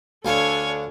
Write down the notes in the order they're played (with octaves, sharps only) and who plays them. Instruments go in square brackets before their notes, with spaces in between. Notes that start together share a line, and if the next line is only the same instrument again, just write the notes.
[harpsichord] D2 F5 [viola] D4 A4 [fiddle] C#5 G#5